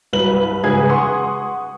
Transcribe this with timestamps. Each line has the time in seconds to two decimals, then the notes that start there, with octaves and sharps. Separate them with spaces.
0.13 C2 G2 F#3 B4 F#7
0.64 G#2 C#3 G#4 B4 G#6
0.89 F#5 C6 C#6 D#6